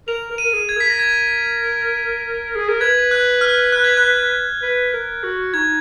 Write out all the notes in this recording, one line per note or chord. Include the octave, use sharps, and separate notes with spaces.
A#4 F7
A#4
D#7
A#4
G#4
G#6
A#4 B6
A#6
G#6
G#4
A#4
B4 G#6
F#6
F6
F#6
G#6
F#6
B4
A#4
F#4
D#4 G#6